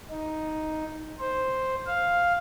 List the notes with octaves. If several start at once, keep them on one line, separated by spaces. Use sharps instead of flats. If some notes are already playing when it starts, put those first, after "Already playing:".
D#4
C5
F5